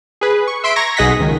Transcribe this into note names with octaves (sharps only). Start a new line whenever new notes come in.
G#4 B4
C#6
E5 C6 B6 D7
A#5 C#6 G#6 A#6
B1 G#4 D#5 F#5 A#6 B6
C#2 D#3